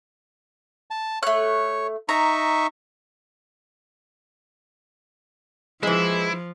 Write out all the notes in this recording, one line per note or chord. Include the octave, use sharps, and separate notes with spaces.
A5
A3 C#5 F#6
D#4 E5 A#5 C#6
E3 F3 G#3 E4